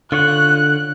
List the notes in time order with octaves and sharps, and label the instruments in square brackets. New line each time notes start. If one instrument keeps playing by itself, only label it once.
[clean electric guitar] D3 [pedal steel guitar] F4 C#5 F#5 [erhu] F#6